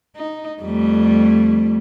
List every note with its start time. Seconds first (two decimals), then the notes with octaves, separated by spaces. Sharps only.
0.16 D#4
0.62 F2 G3 A3